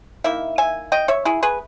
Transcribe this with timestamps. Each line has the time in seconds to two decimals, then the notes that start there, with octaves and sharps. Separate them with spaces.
0.24 D#3 A#3 E4 E5
0.58 E5 G#5
0.92 D#5 G5
1.08 C#5 E5
1.25 E4 G#4
1.43 G#4 B4